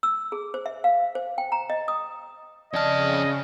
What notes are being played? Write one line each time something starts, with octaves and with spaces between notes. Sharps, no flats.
E6
G#4
C5
E5
F5
C5
G5
A#5
D#5
D#6
F2 C#3 D5 D#5 A5 F6